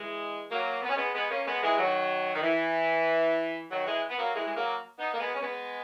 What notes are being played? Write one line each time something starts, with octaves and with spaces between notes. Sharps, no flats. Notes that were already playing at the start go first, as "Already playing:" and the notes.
Already playing: E3 G#3
F#3 A#3
B3
C#4
G#3 B3
G#3 B3
A#3 C#4
G#3 B3
E3 G#3
D#3 F#3
D#3
E3
D#3 F#3
E3 G#3
B3
F#3 A#3
E3 G#3
G#3
F#3 A#3
B3 D#4
A#3
G#3 B3
C#4
G#3 B3